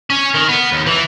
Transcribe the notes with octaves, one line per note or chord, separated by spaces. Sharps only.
C#4
D#3
B3
D#2
E3